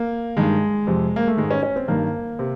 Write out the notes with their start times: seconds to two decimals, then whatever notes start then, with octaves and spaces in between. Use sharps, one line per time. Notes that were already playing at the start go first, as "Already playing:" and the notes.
Already playing: A#3
0.37 G2 D#3 G#3
0.87 F2 C3 F3
1.16 A#3
1.27 A3
1.37 G#2 D#3 G#3
1.51 C#4
1.63 C#4
1.76 C4
1.88 G2 D#3 A#3
2.39 C3